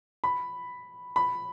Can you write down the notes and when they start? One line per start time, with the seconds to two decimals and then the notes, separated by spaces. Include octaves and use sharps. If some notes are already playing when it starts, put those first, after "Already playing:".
0.24 B5
1.16 B5